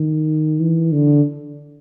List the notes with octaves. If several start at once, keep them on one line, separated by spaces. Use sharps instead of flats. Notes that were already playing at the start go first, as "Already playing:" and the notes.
Already playing: D#3
E3
D3